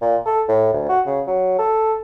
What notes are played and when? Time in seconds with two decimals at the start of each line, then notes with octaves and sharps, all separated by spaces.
0.02 A#2
0.26 A4
0.49 A2
0.73 D2
0.89 F#4
1.07 C#3
1.27 F#3
1.59 A4